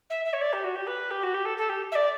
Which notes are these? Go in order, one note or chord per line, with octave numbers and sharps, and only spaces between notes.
E5
E5
C#5
D5
G4
F#4
G4
B4
G4
F#4
G4
A4
A4
G4
E5
D5